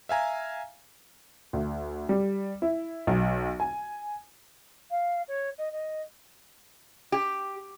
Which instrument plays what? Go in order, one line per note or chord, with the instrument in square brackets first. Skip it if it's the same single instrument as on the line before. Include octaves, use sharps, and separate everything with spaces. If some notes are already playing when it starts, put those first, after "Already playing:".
[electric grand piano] E5 F5 G#5 A#5
[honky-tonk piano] D2
G3
E4
B1
G#5
[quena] F5
C#5
D#5
D#5
[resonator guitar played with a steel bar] G4